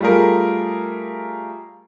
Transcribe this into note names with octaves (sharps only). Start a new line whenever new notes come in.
G3 A3 F4 G#4 A#4